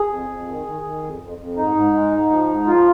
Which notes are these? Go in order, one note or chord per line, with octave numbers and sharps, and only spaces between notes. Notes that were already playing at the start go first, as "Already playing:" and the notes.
Already playing: G#4
F2
F2
D#3
D#3
D#3
F2
F2
F2
G#2 D#4
G#2
G#3
G#2
F3
G#2
F3 F4